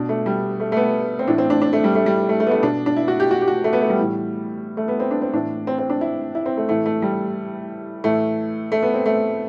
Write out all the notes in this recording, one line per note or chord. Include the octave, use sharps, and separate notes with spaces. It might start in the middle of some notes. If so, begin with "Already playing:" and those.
Already playing: B2 D4
A3
G3
A3
A3
B3
C4
A2 E3 D4
C4
D4
D4
A3
G3
A3
G3
A3
A3
B3
A3
B2 D4
D4
E4
F#4
G4
F#4
G4
F#4
A3
B3
A3
G3
A2 E3
A3
B3
C4
D4
C4
A2 E3 D4
C4
C4
D4
E4
E4
C4
A3
A2 E3 A3
A3
G3
A2 E3 A3
A3
B3
C4
A3